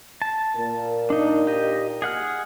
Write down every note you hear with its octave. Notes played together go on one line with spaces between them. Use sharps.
A5
A#2 A#4
D4 D#4
G4 D#5
G#4 F#5 F6